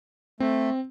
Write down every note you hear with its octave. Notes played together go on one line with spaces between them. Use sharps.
A3 C4